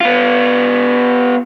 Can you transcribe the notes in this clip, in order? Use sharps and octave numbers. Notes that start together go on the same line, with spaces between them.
B3 F4